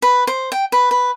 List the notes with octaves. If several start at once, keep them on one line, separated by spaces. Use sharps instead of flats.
B4
C5
G5
B4
B4